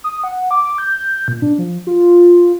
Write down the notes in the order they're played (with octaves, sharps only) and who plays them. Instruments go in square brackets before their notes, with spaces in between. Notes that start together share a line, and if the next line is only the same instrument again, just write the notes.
[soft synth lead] D#6
F#5
D6
G6
A#2
D4
F3
F4